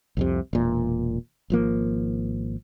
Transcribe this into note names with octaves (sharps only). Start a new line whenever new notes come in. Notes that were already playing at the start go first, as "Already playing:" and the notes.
C2 F2 C3
E1 A#2
G#1 F3 A#3